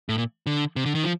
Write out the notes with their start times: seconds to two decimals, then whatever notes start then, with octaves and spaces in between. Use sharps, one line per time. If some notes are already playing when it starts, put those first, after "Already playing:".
0.09 A2
0.18 A#2
0.46 D3
0.76 C3
0.86 D3
0.95 D#3
1.03 F3